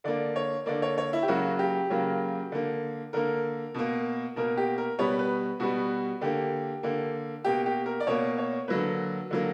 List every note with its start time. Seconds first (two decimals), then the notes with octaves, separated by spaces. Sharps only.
0.04 D3 A#3 D5
0.36 C#5
0.66 D3 A#3 D5
0.82 C#5
0.98 C#5
1.13 E4
1.23 G4
1.28 C#3 F#3 A#3 F#4
1.59 G4
1.90 C#3 F#3 A#3
2.52 D3 A#3
3.13 D3 A#3 A#4
3.74 B2 A#3
4.36 B2 A#3 A#4
4.57 G4
4.78 A#4
4.99 B2 G3 B3 C#5
5.19 B4
5.60 B2 G3 B3 F#4
6.21 D3 A#3 G4
6.83 D3 A#3
7.44 B2 A#3 G4
7.66 G4
7.86 A#4
8.00 D5
8.07 B2 A#3 C#5
8.38 C#5
8.68 D3 F#3 A#3 B4
9.30 D3 F#3 A#3